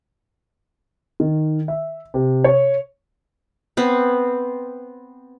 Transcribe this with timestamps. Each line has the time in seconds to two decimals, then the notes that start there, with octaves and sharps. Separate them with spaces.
1.20 D#3
1.68 E5
2.14 C3
2.44 C#5
3.77 B3 C4